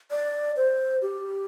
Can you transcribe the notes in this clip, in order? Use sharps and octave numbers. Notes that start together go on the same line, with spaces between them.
D5
C5
G4